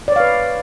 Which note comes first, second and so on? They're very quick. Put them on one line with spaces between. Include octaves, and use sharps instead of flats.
D5 C#5 F5 B4